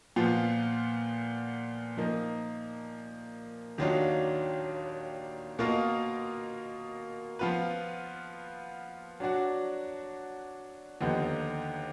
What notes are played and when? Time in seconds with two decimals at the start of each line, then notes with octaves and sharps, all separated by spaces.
0.16 A#2 F3 B3 F4
1.97 F3 A#3 D#4
3.78 D#2 D#3 F#3 D4 F4
5.59 B2 A#3 F4 A#4 D#5
7.39 F3 B3 F4 B4
9.20 F#3 D4 F#4 D5
11.01 D#2 D3 F3 B3 D#4